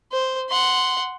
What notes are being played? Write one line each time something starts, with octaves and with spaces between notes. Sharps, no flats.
C5
F#5 C6